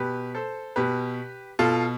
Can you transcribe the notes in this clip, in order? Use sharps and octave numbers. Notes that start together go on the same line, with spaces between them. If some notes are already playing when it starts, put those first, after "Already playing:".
Already playing: B2 G4 B4
A4 C5
B2 G4 B4
B2 F4 A4